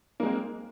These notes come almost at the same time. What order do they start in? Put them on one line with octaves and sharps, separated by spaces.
A#3 G#3 C4